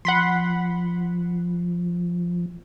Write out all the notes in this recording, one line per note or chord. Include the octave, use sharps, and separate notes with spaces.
F3 F#5 B5 C6